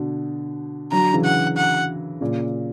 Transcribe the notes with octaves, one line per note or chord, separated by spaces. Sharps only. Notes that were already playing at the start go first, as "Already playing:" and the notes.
Already playing: B2 D3
D3 F#3 A#5
C#3 E3
F#5
F#5
A#2 C#3